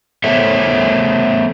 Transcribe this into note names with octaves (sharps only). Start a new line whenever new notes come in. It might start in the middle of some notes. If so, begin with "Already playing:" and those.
A3 B3 A4 C5 C#5 E5